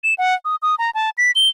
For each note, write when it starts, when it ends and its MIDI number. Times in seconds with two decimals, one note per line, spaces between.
0.04 0.14 100
0.18 0.34 78
0.45 0.56 87
0.62 0.75 87
0.79 0.91 82
0.95 1.10 81
1.18 1.31 95
1.36 1.48 103